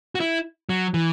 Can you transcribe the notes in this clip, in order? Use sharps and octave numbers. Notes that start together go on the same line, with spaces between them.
F#4
E4
F#3
E3